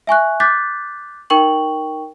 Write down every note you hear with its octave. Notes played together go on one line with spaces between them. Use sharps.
E5 G#5 C#6 F#6
D6 F#6 G6 A6 B6
D#4 A#4 G5 C#6 F#7